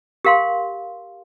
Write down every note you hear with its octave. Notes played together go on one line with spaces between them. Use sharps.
G4 A#4 F5 C6